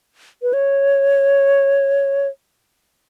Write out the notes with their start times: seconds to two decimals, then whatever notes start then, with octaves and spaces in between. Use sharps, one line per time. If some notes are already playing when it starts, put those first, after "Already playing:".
0.42 B4
0.53 C#5